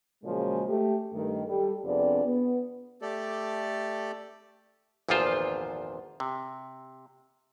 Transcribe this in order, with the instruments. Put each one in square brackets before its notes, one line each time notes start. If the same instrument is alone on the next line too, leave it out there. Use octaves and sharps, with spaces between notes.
[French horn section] A#2 C#3 F3 F#3 G#3
A3 G4
G2 D#3 A3
G3 A4
F2 C3 B3 D4 G#4 D5
B3
[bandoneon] A3 G4 A4 D5
[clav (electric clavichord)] G#1 E2 A#2 F3 F4 C5
C3